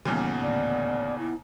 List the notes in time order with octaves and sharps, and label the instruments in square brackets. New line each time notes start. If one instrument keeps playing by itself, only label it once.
[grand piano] D#2 A#2 C#3 [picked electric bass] E3 G3 [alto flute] B3
[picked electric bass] A1 D2 [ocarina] D5
[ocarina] E4